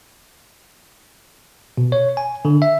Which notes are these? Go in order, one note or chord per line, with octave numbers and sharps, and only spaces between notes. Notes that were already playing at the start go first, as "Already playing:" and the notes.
B2
C#5
G#5
D3
E5